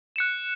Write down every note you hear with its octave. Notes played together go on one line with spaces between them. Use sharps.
F#6 C#7 E7